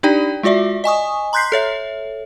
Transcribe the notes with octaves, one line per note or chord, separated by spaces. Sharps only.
D4 D#4 G4 D5 G5
G#3 F4 F#4 D5 E5
D#5 G#5 C#6 D#6
A#5 C6 F#6 G6 B6 C7
A4 C#5 E5